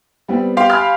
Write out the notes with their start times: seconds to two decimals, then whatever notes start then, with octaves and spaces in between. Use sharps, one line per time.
0.28 G3 B3 C4
0.57 G4 F5 C6
0.70 G#5 B5 F6